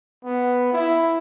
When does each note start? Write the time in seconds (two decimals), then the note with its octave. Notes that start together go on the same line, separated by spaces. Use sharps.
0.25 B3
0.73 E4